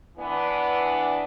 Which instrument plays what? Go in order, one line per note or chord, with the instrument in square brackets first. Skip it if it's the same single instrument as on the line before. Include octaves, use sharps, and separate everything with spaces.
[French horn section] E3 B3 D4